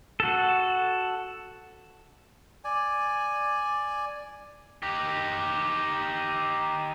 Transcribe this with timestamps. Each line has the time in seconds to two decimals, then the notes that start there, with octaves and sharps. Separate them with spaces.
0.20 F#4 A4
2.64 D5 G#5
4.83 D#4 G4